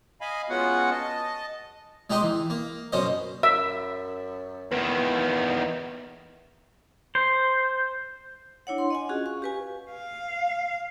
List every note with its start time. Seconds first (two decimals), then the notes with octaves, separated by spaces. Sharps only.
0.21 D#5 F5 G#5 B5
0.50 G#3 B3 C#4 F4 F#4 F#5
0.91 D#5 A5
2.10 G#3 D#4 G4 D#5 C6
2.23 E3
2.50 A#3
2.92 F#2 B2 C#4 C5 D#5
3.43 F#2 E5
4.71 E2 D#3 B4
7.15 C5
8.67 D4 E4 C#5 F#5
8.78 C6
8.90 D#5 F#5 G#5
9.09 C#4 F4 F#4 G#4
9.26 F5 C#6
9.42 G4 B4 G#5
9.91 F5